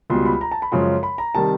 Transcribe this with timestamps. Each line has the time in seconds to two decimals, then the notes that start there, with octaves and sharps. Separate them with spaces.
0.10 C#2 B2 G3 C6
0.26 B5
0.41 A#5
0.52 A5
0.62 B5
0.72 F#2 C#3 F3 G#3 C6
1.03 B5
1.18 A#5
1.35 C3 D#3 G3 A5